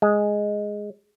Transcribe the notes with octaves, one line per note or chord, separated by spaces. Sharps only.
G#3